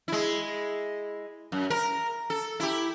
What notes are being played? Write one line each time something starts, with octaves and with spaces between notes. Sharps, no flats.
G#3 E4
F#2
A#4
A4
E4 G4